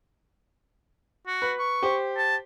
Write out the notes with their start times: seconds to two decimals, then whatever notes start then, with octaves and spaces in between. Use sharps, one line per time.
1.27 F#4
1.42 B4
1.59 C#6
1.83 G4 C5
2.17 A5